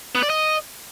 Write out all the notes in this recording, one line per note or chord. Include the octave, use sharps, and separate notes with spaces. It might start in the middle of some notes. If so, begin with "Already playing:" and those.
B3
D5
D#5